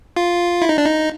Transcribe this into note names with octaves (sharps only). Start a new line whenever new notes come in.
F4
E4
D#4
D4
D#4